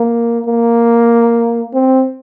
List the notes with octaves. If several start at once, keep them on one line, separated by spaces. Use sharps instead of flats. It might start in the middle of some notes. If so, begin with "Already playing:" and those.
Already playing: A#3
A#3
C4